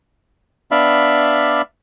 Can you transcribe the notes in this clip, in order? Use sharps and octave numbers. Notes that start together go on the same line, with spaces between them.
B3 D4 D5 E5 F5 B5